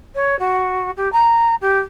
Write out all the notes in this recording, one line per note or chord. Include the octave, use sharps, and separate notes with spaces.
C#5
F#4
G4
A#5
G4